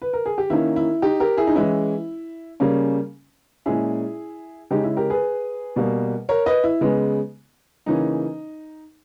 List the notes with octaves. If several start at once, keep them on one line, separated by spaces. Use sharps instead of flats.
B4
A#4
G#4
G4
D#3 A#3 C#4 E4
E4
D#4 G4
G4 A#4
E4 G#4
D#4
E3 G#3 C#4 E4
C#3 G3 A#3 C#4
A#2 G#3 C#4 E4 G#4
C#3 G#3 C#4 D#4 G4
E4
G4 A#4
G#4 B4
B2 G3 A#3
A#4 C#5
B4 D#5
E4
C#3 G#3 B3
C#3 E3 A#3 C#4 D#4